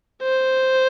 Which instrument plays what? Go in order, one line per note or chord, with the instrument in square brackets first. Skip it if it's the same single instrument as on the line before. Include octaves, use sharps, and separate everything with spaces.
[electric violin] C5